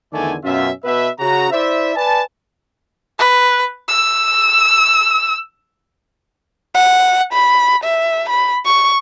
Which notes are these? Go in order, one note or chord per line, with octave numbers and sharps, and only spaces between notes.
E2 D3 D#3 A3 D5 G#5
F#2 B2 C#4 F4 E5
B2 B4 E5
C#3 F#4 A#5
E4 C5 D5 E5
B4 D5 G#5 A5
B4
E6
F#5
B5
E5
B5
C#6